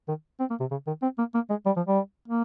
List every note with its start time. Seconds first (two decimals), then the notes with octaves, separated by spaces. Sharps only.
0.08 D#3
0.40 C4
0.50 A#3
0.60 C3
0.71 C#3
0.87 D#3
1.02 C4
1.18 A#3
1.34 A#3
1.50 G#3
1.66 G3
1.76 F3
1.87 G3
2.28 A#3